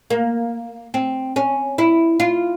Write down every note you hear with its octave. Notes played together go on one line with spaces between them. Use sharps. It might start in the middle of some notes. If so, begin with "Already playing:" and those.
A#3
C4
C#4
E4
F4